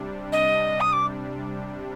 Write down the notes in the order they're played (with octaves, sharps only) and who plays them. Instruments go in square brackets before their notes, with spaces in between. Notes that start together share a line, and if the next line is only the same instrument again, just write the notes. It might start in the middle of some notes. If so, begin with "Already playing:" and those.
Already playing: [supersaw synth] C3 G3 D4
[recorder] D#5
D#6
D6